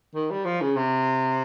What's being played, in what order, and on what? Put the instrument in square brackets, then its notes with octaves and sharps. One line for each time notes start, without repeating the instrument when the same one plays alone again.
[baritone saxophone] D#3
G3
F3
C#3
C3